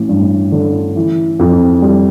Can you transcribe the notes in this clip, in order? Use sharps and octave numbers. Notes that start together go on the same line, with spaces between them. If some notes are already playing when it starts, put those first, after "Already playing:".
Already playing: A1
G2
D3
E3
F2
G3